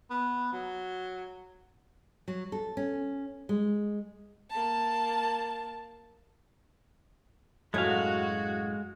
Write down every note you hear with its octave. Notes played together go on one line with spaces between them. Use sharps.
B3
F#3
F#3
A4
C#4
G#3
A#3 A5
F#2 A2 G#3 A3 F#4 G#4 F5